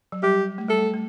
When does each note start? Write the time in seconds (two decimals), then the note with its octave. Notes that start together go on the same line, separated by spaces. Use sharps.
0.12 F#3
0.23 G3 G4
0.58 A3
0.68 G3 A4
0.78 A3
0.94 A3